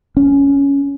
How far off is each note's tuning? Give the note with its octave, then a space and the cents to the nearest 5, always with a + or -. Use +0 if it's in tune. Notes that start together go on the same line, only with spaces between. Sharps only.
C#4 +10